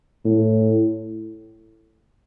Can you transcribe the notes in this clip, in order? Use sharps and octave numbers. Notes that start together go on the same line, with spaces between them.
A2